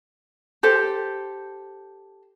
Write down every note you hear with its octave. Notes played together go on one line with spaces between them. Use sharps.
G4 A4 C5